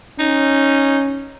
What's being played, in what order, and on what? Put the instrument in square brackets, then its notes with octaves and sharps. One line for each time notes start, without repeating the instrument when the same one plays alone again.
[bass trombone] C#4 [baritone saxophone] D#4